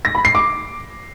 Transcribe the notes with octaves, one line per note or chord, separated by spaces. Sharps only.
A#6
B5
C7
D6